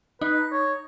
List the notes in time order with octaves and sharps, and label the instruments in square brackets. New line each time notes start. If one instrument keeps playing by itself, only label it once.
[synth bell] D#4 [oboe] B4
[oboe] C#5